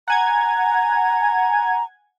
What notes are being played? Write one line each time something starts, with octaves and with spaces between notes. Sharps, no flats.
F#5 G#5 A#5 G#6